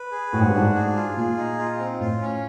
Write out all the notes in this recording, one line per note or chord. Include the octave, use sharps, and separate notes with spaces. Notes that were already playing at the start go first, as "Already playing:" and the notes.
Already playing: B4
G#4
A2 F#4
G#2
G2
G#2 D4
G#4
F4
A#2 G#4
D#4
F4
C4
A2 F4
C#4